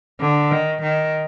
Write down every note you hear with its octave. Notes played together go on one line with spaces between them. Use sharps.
D3
D#3
D#3